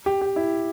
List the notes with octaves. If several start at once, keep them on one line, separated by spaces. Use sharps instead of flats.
G4
G4
E4